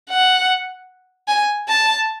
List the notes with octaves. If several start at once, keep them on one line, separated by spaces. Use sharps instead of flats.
F#5
G#5
A5